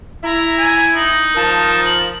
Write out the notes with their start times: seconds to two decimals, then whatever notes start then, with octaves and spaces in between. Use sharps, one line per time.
0.24 E4 A#5
0.59 G#5
0.96 D#4 F#7
1.35 F3 A#4 A5
1.86 F#7